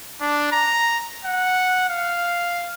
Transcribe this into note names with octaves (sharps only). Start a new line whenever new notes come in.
D4
A#5
F#5
F5